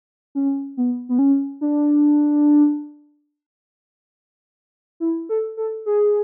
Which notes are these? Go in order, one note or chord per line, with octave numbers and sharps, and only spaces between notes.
C#4
B3
B3
C#4
D4
E4
A4
A4
G#4